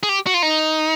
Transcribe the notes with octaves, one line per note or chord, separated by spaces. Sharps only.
G#4
G4
F#4
F4
D#4